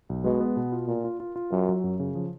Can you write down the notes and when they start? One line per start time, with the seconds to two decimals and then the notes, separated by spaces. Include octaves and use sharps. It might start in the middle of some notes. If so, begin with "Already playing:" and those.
0.09 B1
0.24 B2 G#3
0.40 B3
0.57 B2
0.72 F4
0.88 A#2 F4
1.04 F4
1.20 F4
1.36 F4
1.52 F#2 F#3
1.69 F#3
1.84 F#2
2.00 C#3
2.15 F3